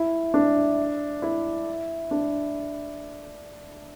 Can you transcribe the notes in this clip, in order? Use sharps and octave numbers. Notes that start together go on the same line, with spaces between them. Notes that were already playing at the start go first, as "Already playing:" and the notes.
Already playing: E4
D4
E4
D4